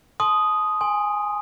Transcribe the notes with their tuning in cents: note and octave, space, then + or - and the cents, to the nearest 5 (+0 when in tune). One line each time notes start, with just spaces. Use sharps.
A5 -45 C6 +0 D#6 +0
G#5 -5 C6 +0